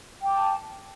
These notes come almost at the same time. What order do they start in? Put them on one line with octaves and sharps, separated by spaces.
G5 D6 A5